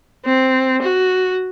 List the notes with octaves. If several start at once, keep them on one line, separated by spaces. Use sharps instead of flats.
C4
F#4